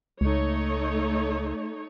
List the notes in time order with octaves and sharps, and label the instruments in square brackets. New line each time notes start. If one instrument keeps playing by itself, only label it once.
[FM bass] C#2 [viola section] A3 D#4 C#5